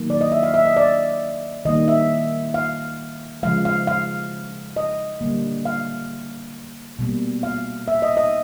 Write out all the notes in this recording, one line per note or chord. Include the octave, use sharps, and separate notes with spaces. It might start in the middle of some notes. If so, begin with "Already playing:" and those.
Already playing: D#3 F#3 A#3
D5
D#5
E5
F5
E5
D#5
D5
D#3 G3 A#3 D#5
E5
F5
C#3 F3 G#3 F5
F5
F5
D#5
D3 G3 A#3
F5
B2 G3 A#3
F5
E5
D#5
D#5